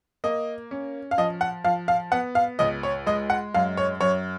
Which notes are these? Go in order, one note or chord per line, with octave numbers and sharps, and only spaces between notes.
A#3 D#5
C#4
F5
F3 D#5
F#5
F3 F5
F5
B3 F#5
F5
C#2 D#5
C#5
G#3 D#5
F#5
F#2 F5
C#5
F#2 C#5